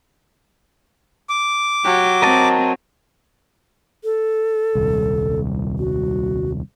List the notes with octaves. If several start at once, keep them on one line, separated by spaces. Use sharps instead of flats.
D6
F#3 G4
C4 A#4 D#5 A5
A4
D#1 C2
F#4